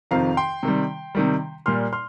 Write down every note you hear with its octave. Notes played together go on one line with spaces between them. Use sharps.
F2 C3 D#3 C4 F4 F5 A#5
G5 C6
C3 D#3 G3
C3 D#3 G3
A#2 G3 A#3 C6 F6
C6 F6